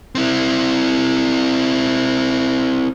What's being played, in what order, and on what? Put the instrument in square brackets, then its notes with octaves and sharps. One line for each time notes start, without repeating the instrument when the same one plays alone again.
[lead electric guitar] C4 E4